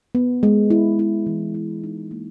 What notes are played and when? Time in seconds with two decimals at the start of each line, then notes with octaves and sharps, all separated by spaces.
0.15 B3
0.43 G#3
0.70 E4
0.99 E4
1.26 E3
1.54 E4
1.84 D#4
2.11 A#3